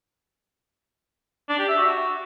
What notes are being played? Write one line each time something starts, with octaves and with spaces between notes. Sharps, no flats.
D4
G4
E5
F#4